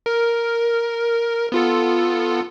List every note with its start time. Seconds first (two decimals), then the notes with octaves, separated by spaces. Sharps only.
0.06 A#4
1.52 B3 F4 A4